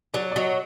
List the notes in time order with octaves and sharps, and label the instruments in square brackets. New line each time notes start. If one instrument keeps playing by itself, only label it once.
[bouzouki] F#3 [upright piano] D5
[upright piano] D5
[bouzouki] F#3 [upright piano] D#5